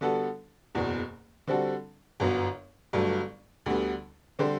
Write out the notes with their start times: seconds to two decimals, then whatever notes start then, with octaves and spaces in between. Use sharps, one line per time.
0.01 D3 G3 B3 F#4 A4
0.75 F#1 E2 B2
1.47 D3 G3 C4 F#4 A4
2.20 G1 F#2 F#3 B3
2.93 G1 G2 F#3 A3
3.66 D2 D3 G3 B3
4.39 D3 G3 C4 G4 C5